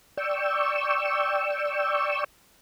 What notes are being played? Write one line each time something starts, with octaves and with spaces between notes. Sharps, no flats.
D5 G5 C#6 E6